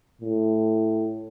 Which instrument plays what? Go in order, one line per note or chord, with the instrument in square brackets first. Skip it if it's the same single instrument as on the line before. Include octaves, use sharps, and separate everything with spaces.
[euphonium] A2